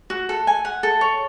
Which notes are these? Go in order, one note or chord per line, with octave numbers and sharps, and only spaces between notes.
F#4
A4
G#5
F#5
A4
C#5